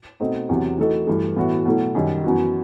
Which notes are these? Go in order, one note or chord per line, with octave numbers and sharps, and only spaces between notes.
B2 A3 C4 D#4
E2 C3 F#3
E3 A3 D#4 F#4 A4
G2 E3 A3
A2 E3 B3 F#4
B2 F#3 A3 E4
F#2 D#3 G3
F#2 E3 B3 F#4